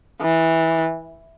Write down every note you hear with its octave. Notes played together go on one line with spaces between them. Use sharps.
E3